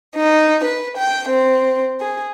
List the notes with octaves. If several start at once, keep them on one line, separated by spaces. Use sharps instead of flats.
D#4
B4
G5
C4
G#4